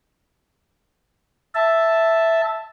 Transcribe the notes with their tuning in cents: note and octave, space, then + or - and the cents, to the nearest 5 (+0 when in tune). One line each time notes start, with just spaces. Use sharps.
E5 +0 A5 +0